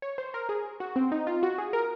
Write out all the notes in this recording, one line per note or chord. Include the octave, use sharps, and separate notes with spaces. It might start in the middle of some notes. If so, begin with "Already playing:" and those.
C#5
C5
A#4
G#4
F#4
C4
D#4
F4
F#4
G#4
A#4